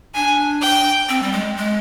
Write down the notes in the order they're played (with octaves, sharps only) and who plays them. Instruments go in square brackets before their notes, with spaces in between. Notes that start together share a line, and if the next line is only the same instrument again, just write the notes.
[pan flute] D4 [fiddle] G#5
[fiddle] G5
[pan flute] C4
G3
G#3
G#3